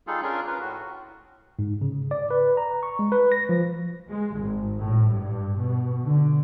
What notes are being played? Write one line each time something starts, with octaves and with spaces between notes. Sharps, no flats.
G3 D#4 F4 G#4 A4
C#4 D4 F4 G#4 A#4
C#4 F4 A#4 B4
A2 F#4
G#2
C#3
D5
B4
A#5
C#6
G#3
B4
A#6
F3
G#3
G#1
A2
G2
B2
D3